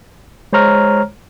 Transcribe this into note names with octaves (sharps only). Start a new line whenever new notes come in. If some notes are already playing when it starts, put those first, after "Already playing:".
G#3 C5 C#5 A#5 F6